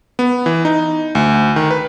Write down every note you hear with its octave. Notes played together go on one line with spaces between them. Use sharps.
B3
E3
D#4
D2
D#3
B4